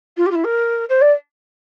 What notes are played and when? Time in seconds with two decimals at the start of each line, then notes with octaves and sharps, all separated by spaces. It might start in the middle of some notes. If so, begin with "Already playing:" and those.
0.17 F4
0.26 G4
0.31 F4
0.35 E4
0.44 A#4
0.89 C5
1.01 D5